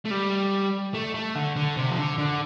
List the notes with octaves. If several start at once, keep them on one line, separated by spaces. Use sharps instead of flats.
A3
G3
A3
A3
D3
D3
C3
F3
D3
D3